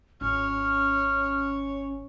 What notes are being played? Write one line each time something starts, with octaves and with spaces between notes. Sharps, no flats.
G#1 C#4 C#5 F6